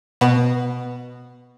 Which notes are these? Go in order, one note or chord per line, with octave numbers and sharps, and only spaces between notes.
B2 B3